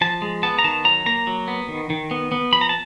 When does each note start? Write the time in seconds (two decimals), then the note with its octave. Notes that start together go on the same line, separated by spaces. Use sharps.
0.01 F3 A5
0.22 G#3
0.43 B3 A5
0.59 A#5
0.64 D#3 A5
0.85 F#3 A#5
1.06 A#3 A#5
1.27 F#3
1.48 B3
1.68 D#3
1.90 D#3
2.11 B3
2.32 B3
2.52 F3 B5
2.61 A#5
2.69 A5